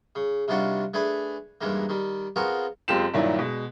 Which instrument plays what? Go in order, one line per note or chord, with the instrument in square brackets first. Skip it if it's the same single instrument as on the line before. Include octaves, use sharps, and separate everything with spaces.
[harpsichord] C#3
C3 D#3 G3 D4 F4 F#4
A3 D4 G#4 B4 G#5
E2 G2 D#3 G#3 A#3
D#3 G3
B3 C4 F4 F#4 G#4 A#4
[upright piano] F#1 G#3 C4 F4 G4 E7
G2 A#2 D#3 F#3 D4 E4
B2 G#3